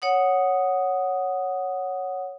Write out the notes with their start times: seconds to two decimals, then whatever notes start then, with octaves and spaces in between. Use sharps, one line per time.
0.02 C#5 F#5 D#6